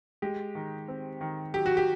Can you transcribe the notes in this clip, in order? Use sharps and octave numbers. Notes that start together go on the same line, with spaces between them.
G#3 G4
D#3
C4
D#3
F#3 G4
F#4
G4